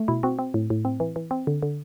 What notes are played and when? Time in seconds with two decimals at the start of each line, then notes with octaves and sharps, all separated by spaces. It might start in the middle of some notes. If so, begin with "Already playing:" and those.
Already playing: A3
0.08 B2 E4
0.23 C4 F#4
0.39 C4
0.54 A2
0.70 A2
0.85 C4
1.00 E3
1.16 E3
1.31 C4
1.47 D3
1.63 D3